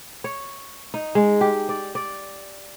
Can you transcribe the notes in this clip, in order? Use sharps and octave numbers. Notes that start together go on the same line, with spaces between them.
C#5
D#4
G#3
G4
D5
D5